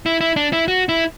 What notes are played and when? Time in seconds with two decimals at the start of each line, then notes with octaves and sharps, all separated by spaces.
0.06 E4
0.21 E4
0.36 D4
0.53 E4
0.68 F#4
0.89 E4